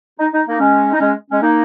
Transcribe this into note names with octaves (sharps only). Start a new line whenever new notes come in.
D#4
D#4
A#3 D#4
G#3 C#4
D#4
G#3 C#4
G#3 C#4
A#3 D#4